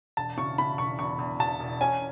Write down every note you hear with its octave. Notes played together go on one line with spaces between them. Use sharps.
E1 A5
C#3 C#6
C#3 B5
E1 C#6
E2 C#6
E2
E2 A5
E1
C#4 G#5